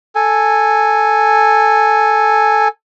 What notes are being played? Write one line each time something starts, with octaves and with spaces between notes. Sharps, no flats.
A4 G#5